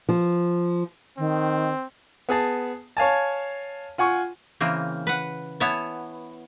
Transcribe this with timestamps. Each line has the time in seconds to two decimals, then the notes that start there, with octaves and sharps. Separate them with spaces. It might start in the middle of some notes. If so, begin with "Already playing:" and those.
0.09 F3
1.18 D#3 C4
2.29 B3 G#4 A5
2.97 C#5 F5 G#5 A5
3.98 F4 F#5 G#5 C#6
4.61 C#3 E3 A#3 C4
5.07 B4 F#5
5.60 B3 E4 C#5 G#5 A5